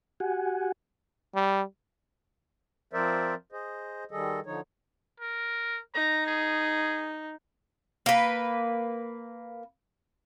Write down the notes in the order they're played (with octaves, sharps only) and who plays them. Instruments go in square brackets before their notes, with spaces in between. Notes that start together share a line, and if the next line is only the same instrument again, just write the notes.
[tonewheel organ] F#4 G4 F#5 G#5
[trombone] G3
[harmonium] F3 C4 A#4 C5 D5 E5
G#4 C5 D#5
D#3 G3 G#4 A4 D#5
D3 F3 D#4 C#5
[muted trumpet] A#4
[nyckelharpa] D#4 [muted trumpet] A#5
[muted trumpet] G#4
[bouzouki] A#3 B4